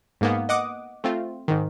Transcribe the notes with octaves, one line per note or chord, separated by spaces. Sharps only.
G#2 A#3 B3
D#5 F#5 D6 D#6
A3 C4 F4
G#2 D#3